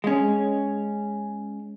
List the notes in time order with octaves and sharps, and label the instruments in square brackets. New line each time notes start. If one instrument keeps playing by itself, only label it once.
[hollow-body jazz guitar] G#3 C#4